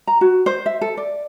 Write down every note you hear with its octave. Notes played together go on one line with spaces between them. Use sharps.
A#5
F#4
C5
E5
A4
D5